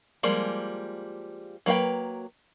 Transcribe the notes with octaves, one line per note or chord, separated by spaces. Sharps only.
F3 G3 G#3 A#3
F#3 A#3 B4 G5